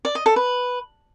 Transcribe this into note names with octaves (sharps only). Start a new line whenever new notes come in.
D5
D#5
A4
B4